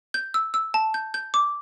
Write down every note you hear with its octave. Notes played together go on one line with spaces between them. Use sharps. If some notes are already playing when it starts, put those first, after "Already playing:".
G6
E6
E6
A5
G6
G6
D6